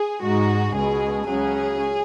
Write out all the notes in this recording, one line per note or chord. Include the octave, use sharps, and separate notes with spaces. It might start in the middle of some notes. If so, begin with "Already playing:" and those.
Already playing: G#4
G#2 G#3 D#4 F#4
C#2 B2 G#3 G#4
C#2 C#3 F#3 C#4 G#4